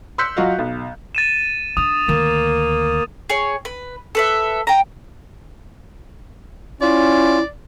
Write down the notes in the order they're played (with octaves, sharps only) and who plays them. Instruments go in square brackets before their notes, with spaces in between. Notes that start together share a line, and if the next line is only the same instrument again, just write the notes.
[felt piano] C6 E6 F#6 G6 B6 C#7
F#3 F4 F#4 D#5 F5
B1
[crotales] A6 D#7 E7
[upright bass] D4 [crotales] D#6
[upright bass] D2 D#3 [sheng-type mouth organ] A#3
[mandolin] G#4 C#5
B4
A4 B4 E5
G5 A#5
[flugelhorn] C#4 [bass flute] E4 [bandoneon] F4 [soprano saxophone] D5